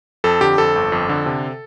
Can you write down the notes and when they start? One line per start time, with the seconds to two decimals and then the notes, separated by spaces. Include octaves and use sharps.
0.24 F2 A4
0.41 D3 G4
0.58 F2 A4
0.75 G1
0.92 F2
1.09 D3
1.26 C3